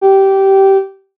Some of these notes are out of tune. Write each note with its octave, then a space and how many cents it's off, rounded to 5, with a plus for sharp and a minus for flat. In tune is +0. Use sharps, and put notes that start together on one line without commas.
G4 -15